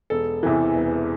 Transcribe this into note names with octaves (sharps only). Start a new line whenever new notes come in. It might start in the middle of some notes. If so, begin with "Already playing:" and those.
E1 A4
E2 C3 E3
E1